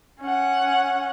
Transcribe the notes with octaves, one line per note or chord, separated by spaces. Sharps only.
C#4 F#5